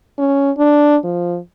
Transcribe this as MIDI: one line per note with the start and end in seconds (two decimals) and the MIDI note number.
0.18 0.51 61
0.58 0.96 62
1.04 1.38 53